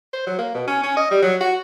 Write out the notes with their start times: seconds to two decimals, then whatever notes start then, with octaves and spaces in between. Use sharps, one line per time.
0.13 C5
0.26 F#3
0.38 A#3
0.54 B2
0.67 C#4
0.83 C#4
0.96 D#5
1.11 G3
1.23 F#3
1.41 F#4